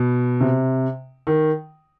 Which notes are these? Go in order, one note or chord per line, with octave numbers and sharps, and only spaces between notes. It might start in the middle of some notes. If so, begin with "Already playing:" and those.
Already playing: B2
C3
D#3